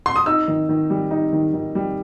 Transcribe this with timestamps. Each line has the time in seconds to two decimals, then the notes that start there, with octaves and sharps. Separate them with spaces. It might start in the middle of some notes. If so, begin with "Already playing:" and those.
0.06 C6
0.16 D#6
0.26 D#4 E6
0.48 D#3
0.69 D#3
0.90 G3
1.11 D#4
1.33 D#3
1.54 D#3
1.75 G3